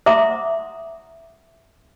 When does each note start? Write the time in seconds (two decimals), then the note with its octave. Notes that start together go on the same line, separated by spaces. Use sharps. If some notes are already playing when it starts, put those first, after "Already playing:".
0.06 E5 F#5 A#5 C6 D6 D#6